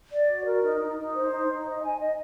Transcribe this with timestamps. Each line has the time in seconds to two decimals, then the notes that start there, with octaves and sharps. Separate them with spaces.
0.11 D5
0.28 F#4
0.45 A#4
0.62 D#4
0.80 D#4
0.97 D#4
1.14 C5
1.30 D#4
1.48 D#4
1.66 D#5
1.83 G#5
2.00 D#5